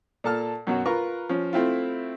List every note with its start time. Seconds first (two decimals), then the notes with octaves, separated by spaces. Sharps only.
0.24 A#2 A4 A5 F6
0.67 F#2 B2 F#3 F#4
0.86 F4 A#4 B4 A#5 C#6
1.29 F3 C#4
1.53 A3 C4 E4 F4